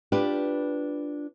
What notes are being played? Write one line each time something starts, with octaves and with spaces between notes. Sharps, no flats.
D4 F4 G4 B4